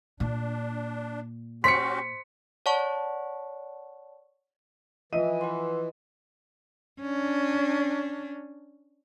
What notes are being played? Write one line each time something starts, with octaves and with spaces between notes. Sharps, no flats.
A#2 D4
C#4 F#4 G4 C5 C6 B6 C#7
C#5 D5 F#5 A5 C#6
E3 F3 D#5 E5 D#7
B4 F#5 C6
C#4 D4